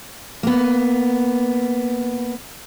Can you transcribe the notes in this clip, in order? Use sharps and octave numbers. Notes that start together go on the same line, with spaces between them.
A#3 B3